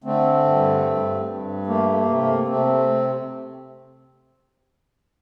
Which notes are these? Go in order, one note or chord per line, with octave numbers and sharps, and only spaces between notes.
D3 A3 C4
G2
G2
G2
A3 A#3
A#3
C3
A#3
C3 A3 C4